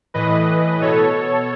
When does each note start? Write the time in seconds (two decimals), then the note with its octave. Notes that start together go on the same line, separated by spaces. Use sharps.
0.14 A2 E3 B4 D#5
0.81 B2 A4 C#5